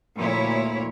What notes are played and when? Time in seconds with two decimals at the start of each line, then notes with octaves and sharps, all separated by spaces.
0.17 D2 A#2 F3 E4 C#5